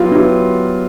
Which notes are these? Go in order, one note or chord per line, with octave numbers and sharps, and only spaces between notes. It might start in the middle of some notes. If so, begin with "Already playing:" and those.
Already playing: F#3 B3 E4 F4 G4
F#3 B3 E4 G4